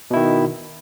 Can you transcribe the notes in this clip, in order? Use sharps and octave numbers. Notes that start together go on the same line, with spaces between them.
B2 D#3 E4